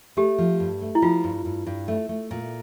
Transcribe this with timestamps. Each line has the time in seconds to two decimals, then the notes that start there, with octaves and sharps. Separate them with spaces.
0.17 A3 G4
0.38 F3
0.60 G2
0.81 A3
0.95 E4
1.02 F3 F4
1.24 G2
1.45 G2
1.67 G2
1.88 A3
2.09 A3
2.31 A#2